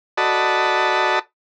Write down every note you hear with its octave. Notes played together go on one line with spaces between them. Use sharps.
F#4 A4 D5 D#5 A5 B5